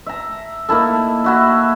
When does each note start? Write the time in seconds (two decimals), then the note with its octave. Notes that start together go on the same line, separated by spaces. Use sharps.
0.06 E5 A#5
0.69 A#3 D#4 E4 A4
1.24 E4 F#4 E5